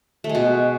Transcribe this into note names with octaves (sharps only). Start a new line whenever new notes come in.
A3
G#3
B2